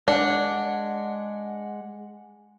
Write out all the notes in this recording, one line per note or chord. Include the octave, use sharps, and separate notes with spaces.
G#3 D4 F#5